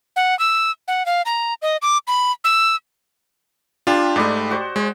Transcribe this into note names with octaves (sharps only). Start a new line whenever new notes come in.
F#5
E6
F#5
F5
A#5
D#5
D6
B5
E6
D4 F4 G4 C6
G#2 A3 B4 D5 D#5
F#4 C5 D#5
G#3 C5